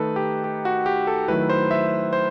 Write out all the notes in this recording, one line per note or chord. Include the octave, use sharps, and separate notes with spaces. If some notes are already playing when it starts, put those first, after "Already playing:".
Already playing: D#3 A3 D#4 A4 B4
G4
G4
F#4
G4
A4
D#3 F#3 A3 E4 B4
C5
E5
C5